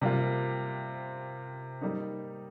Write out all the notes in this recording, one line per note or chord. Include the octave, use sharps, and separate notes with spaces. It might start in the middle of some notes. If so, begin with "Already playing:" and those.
C3 G3 A#3 F4
G3 A#3 D#4